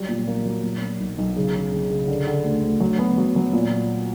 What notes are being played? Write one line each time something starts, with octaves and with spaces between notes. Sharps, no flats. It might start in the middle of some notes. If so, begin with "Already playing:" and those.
Already playing: F#3 G3
A#2
A#3
F#3
A#2
A#3
B1
B1
C#3
C#3
C#3
C#3
D3
D3
D2
D2
F#3
B3
F#3
F#3
A#2